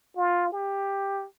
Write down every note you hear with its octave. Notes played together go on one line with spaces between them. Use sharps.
F4
G4